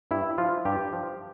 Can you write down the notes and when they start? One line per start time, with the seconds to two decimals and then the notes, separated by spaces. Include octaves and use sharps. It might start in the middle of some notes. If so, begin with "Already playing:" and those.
0.11 G2 E4
0.38 F3 F4
0.65 G2 G4
0.93 F3